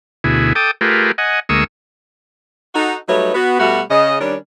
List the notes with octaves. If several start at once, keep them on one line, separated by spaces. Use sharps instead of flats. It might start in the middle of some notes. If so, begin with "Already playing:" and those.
D2 B2 E4 G#4
A4 G5 D6 D#6
A3 F4 G4 G#4 A#4 B4
D#5 F#5 G#5
D2 G#3 A#3 C#6 D#6 E6
D#4 F#4 A4
F#3 G3 A3 D#4 B4 C#5
B3 F#4
B2 G3 A3 F#4
C#3 D#5
D#3 G3 C#4 D4